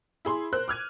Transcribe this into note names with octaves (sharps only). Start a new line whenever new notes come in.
E4 G#4 C6
A#4 C5 F#6
D6 F6 G#6 D#7